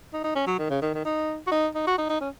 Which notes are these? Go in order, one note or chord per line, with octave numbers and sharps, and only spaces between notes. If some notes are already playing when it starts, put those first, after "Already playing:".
D#4
D#4
C#4
F#3
D#3
C#3
D#3
D#3
D#4
F#4
D#4
D#4
F#4
D#4
D#4
C#4